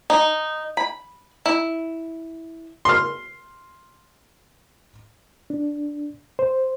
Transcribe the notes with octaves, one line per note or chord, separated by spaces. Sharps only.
D#4
B5
E4
C6 F6
D4
C5